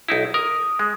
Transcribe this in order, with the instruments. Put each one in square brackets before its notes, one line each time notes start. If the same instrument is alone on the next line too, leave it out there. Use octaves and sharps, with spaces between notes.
[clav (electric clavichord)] B1 D#4 E4
[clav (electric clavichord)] A#4 [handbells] D#6
[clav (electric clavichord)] G#3